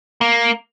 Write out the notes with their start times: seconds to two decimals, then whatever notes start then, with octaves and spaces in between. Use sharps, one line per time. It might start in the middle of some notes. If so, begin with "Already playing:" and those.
0.21 A#3